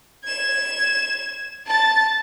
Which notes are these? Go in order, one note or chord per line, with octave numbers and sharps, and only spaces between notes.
G#6 E7
A5 A6